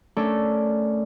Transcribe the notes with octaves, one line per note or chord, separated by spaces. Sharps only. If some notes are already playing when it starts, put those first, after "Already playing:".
A3 C#4 D4 A4 A#4 D5